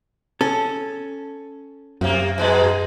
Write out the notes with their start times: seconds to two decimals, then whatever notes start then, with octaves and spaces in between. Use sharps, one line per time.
0.41 C#4 A4
2.01 F#2 C3 A#3
2.38 G#2 B2 G#3